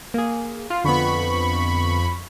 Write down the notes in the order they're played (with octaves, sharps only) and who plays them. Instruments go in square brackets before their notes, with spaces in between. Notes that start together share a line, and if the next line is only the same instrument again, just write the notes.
[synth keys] A#3 G#4
F4
[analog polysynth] F2 B5 C#6 [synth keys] D3 B3